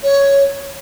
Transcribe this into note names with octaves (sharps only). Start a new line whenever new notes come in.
C#5